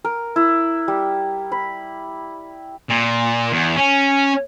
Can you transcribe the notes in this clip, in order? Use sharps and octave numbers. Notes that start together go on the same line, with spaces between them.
A#4
E4
G3
B5
A#2
E2
C#4